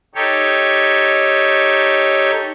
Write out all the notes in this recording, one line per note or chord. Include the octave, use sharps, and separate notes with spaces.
D#4 G4 A4 C#5